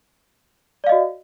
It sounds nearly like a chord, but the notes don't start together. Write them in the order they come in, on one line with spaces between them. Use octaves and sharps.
D5 F5 D#5 F#4